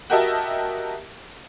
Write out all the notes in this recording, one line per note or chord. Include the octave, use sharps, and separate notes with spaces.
F#4 G4 A#4 D#5 E5 A5